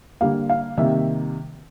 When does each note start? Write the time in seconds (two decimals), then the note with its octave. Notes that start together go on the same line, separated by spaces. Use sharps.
0.21 D3 G3 A#3 F5
0.50 F5
0.78 C3 D#3 G3 A#3 E5